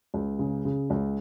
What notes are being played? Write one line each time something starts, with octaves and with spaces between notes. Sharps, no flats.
C#2
C#3
C#3
C#2